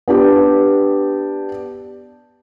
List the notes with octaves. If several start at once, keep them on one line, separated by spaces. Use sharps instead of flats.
B3 D4 G4